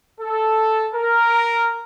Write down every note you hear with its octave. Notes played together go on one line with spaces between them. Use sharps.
A4
A#4